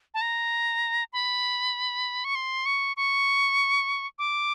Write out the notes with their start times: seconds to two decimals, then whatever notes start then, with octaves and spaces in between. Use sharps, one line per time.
0.14 A5
0.21 A#5
1.13 B5
2.24 C#6
2.35 C6
2.66 C#6
2.97 C#6
4.19 D6